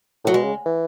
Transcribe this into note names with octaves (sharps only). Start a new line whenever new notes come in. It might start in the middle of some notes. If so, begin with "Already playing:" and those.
A2 F#3
B2 G#3
C#3
E3